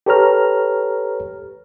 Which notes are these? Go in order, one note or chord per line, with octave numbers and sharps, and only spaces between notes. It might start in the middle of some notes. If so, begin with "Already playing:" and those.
G4 A4 B4 C#5 A#5 F6